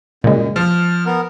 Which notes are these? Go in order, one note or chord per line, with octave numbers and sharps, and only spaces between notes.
F#2 A#2 C#3 G#3
F3 F6
B3 A#4